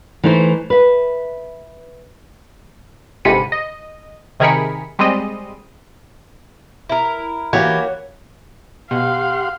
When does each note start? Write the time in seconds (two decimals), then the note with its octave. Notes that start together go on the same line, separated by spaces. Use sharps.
0.24 E3 A3 D#4 E4 C5
0.70 B4 E5
3.25 G1 G#2 C3 B5 C#7 D#7
3.52 D#5
4.40 C3 D#3 G#4 A#4 B5 C#7
4.99 G3 G#3 C4 D#5
6.89 E4 A#4
7.53 E3 A#3 F#4 G4 C#5
8.91 B2 G4 F5 F#5 C6